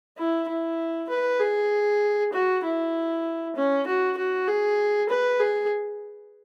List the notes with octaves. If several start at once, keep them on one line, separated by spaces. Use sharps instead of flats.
E4
E4
B4
G#4
F#4
E4
C#4
F#4
F#4
G#4
B4
G#4